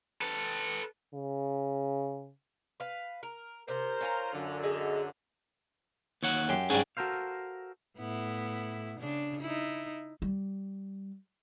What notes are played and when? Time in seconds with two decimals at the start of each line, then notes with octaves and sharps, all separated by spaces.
0.21 A4 B4
1.14 C#3
2.80 B4 F5
3.23 A#4
3.68 C3 A#4 C5
4.01 C#4 F4 A#5
4.33 F#2 D3
4.64 G#4 D#5 E5
6.23 D#2 C#5 F#5
6.49 F#2 G4 C6
6.70 G#2 G3 C#4 D4 G#4
6.97 F#4 A4 A#4 C5 F5
7.98 A2 B3 E4
8.99 C#3 D4
9.41 D#4 E4
10.22 G3